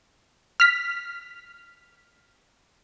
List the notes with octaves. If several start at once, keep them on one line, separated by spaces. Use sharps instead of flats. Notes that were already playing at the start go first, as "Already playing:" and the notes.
F6 B6